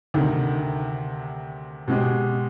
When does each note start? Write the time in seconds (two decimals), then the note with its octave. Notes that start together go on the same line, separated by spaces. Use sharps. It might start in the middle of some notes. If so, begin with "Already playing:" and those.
0.14 D2 C3 D#3
1.88 B2 G#3 C4 G4